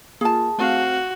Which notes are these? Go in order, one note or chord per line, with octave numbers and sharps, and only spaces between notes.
A#3 F4 G#4 A5
A3 C4 F#4 F5